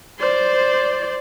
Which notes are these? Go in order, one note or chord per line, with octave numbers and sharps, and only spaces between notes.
C5 D5